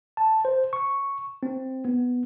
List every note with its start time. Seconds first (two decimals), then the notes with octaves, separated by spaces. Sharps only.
0.17 A5
0.45 C5
0.73 C#6
1.43 C4
1.85 B3